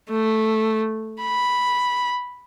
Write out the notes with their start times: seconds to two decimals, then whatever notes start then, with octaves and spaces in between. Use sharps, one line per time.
0.10 A3
1.21 B5